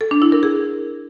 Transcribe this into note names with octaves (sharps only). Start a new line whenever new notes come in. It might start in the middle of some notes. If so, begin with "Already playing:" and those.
A4
D4
E4
A#4
G#4